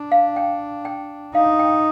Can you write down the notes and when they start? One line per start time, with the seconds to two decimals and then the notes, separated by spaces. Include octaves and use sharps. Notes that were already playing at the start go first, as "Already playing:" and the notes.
Already playing: D4
0.12 F5
0.36 G5
0.85 G5
1.35 D#4 F5
1.59 G5